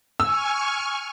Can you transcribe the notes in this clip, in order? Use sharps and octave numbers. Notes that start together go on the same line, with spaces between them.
G#5 C#6 E6 F6